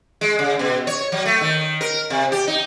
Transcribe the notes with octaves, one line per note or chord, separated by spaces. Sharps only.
G#3
C#3
B2
C#5
F#3
A3
D#3
A#4
C3
G4
D#4